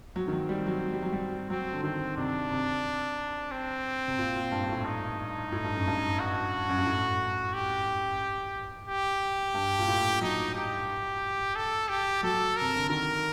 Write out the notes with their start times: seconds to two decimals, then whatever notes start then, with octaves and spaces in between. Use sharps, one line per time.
0.15 F#3 C4
0.28 D#3
0.33 F#3
0.49 G3
0.67 F#3
0.93 G3
1.02 F#3
1.12 G3
1.50 F#3 C4
1.73 D3
1.83 D#3 C4
2.17 C3 D4
2.51 C3
3.51 C4
4.08 C3
4.18 A#2
4.35 A#2
4.51 G2
4.63 G2
4.69 A2
4.85 D#4
5.52 A2
5.64 G2
5.76 F#2
5.87 G2
6.19 F#4
6.69 F#2
6.78 G2
6.86 A2
7.54 G4
8.88 G4
9.54 G2
9.79 A#2
9.88 A2
10.21 F#3 D#4
10.54 G4
11.55 A4
11.89 G4
12.23 F#3 A4
12.56 C3 A#4
12.76 D3
12.89 D#3 A#4